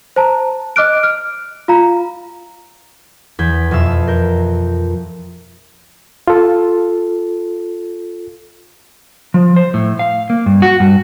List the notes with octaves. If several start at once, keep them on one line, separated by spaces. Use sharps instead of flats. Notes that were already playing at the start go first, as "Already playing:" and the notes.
C5 A5 A#5
D#5 D6 F6 F#6 D7
F6
F4 F5 A#5
E2 G6 G#6 B6
F2 B2 E5 F5 E6
A#4 G6
F4 A4
F3
C5
A2
F5
A#3
G2
F#4
G2